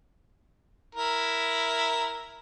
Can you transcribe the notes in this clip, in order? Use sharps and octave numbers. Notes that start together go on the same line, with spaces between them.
E4 A#4